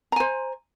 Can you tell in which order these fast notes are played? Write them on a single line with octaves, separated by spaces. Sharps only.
A#5 G#5 C5